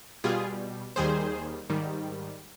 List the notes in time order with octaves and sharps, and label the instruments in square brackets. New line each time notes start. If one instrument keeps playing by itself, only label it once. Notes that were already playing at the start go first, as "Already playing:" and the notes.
[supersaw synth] B2 G3 F4 G#4
D#2 D#3 G3 G#4 C5
G#2 D#3 G3